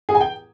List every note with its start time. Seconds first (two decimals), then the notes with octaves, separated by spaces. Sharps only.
0.09 G#4
0.15 G#5
0.21 G5